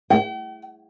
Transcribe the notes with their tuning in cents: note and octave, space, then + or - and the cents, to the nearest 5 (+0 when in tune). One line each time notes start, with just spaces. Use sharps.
G5 -45